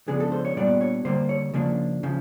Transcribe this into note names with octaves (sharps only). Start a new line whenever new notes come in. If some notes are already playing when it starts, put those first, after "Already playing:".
C#3 F3 G#3 B3 D4 G#4
A4
C5
C#5
A#2 G3 B3 D4 D5
C#5
D3 G3 A#3 C5
C#5
C#3 F3 A#3 D4
C#3 F3